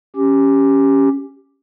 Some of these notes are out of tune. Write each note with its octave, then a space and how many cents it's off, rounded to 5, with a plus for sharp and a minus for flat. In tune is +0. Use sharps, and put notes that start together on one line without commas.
C#4 +0 G4 +0